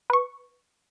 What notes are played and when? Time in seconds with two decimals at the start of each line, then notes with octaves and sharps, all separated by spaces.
0.10 B4 C#6